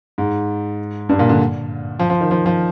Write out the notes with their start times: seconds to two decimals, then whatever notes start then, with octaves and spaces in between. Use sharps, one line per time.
0.18 G#2
1.09 G2
1.19 A#2
1.29 D3
1.99 F3
2.10 F3
2.21 D#3
2.31 F3
2.46 F3